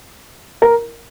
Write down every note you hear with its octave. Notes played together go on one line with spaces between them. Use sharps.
A#4